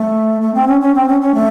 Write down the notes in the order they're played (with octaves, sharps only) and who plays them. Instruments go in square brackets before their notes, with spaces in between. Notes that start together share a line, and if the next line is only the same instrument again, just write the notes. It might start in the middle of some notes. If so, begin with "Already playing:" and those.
Already playing: [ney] A3
A3
C4
C#4
C#4
C4
C#4
C#4
A3